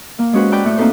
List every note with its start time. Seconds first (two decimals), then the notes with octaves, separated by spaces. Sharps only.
0.19 A#3
0.33 G#3 C#4 F#4 B4 C5
0.52 B4 D5 G5 B5 E6 F#6
0.65 A2 A3 G5
0.77 A#3 C4 D#4 A4 B4 C5